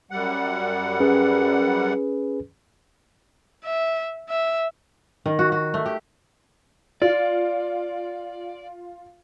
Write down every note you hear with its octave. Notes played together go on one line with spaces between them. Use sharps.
F#2 G3 F#5
C#4 G#4 B4
E5
E5
D#3
F#4
F#4
A3
G4
F4 D5